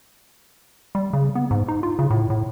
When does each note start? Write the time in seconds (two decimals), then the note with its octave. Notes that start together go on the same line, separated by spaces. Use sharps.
0.95 G3
1.13 C#3
1.35 B3
1.51 G#2
1.68 D#4
1.83 F4
1.99 C#3
2.11 A2
2.30 A2